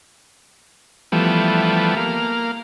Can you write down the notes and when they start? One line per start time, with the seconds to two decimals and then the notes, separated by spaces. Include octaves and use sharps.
1.12 E3 F3 G3 A3 B3
1.97 A#3 F5